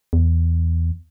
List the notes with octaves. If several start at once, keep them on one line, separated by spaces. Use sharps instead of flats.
E2